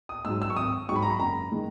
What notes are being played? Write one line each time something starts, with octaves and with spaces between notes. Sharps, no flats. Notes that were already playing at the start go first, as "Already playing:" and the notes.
D#6
G#2 F#3 E6
E6
C#6
G#1 D#6
G#2 F#3 C#6
B5
A#5
B5
F#1 A#5
D#3 G#3